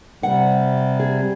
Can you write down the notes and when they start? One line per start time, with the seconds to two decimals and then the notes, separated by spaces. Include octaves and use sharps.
0.23 C3 G3 F#5
1.00 G#4